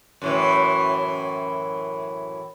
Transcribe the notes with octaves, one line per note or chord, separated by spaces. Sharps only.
F#2 A2 E3